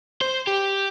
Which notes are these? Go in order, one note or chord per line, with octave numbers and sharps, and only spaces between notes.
C5
G4